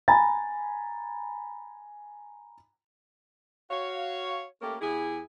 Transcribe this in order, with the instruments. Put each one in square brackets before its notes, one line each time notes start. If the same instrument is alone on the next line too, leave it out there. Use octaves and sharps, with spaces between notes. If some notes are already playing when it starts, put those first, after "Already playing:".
[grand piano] G#5 A#5 B5 A6
[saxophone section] F#4 C#5 F5
A3 A#3 C#4 G4 A4 A#4
E2 E4 G4 G#4